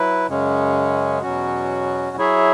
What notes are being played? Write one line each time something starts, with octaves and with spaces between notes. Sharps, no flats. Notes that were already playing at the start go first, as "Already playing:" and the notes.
Already playing: F#3 E4 B4
F#2 C#3 G#3 C#4
E2 B2 F#3 C#4 F#4
F#3 E4 G#4 C#5 E5